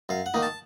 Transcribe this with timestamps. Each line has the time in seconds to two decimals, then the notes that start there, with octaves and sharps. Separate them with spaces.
0.09 F#2 F5
0.26 F#5
0.34 D#3 A#3 D#4
0.42 A5